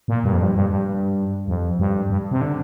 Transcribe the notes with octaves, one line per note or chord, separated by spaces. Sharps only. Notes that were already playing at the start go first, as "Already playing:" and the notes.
A#2
G2
F2
G2
G2
G2
F2
G2
G2
C3
D3